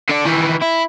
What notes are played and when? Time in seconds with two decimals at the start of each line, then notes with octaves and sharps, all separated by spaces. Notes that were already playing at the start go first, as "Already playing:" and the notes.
0.10 D3 D4
0.26 D#3 E3
0.62 E4